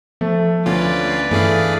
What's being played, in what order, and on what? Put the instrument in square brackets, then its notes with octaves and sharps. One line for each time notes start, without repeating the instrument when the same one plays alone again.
[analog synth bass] F3 [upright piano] A3
[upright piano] D2 [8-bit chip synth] C#4 F4 [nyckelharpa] B4 D5
[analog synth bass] G2 [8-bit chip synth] E3 G#4 F5 [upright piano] A3